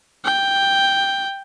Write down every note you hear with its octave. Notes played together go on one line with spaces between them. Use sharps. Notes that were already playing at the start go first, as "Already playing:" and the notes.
G5